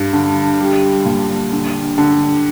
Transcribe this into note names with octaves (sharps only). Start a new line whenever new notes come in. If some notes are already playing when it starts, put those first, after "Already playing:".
Already playing: G2
D3
G3
A#2
D3
D3